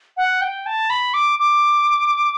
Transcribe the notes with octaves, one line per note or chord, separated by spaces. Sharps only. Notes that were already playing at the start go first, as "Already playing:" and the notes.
F#5
G5
A5
B5
D6
D6